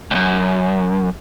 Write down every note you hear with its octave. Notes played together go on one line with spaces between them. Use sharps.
C#2 F#2